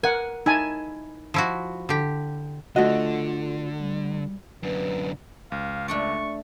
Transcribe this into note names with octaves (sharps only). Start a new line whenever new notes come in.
A#4 F#5 G#5
D#4 E4 G#5 A5
F3 E4 F#4
D3 G4
D3 A3 F4 F#4 D#5
G3
F#2 D3 B4
C#2 F5
A3 D4 D5 C#6